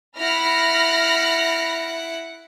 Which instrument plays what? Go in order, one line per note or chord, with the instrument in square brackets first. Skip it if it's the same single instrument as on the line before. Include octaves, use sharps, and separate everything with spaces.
[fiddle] E4 F#5 [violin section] B5 F6 A#6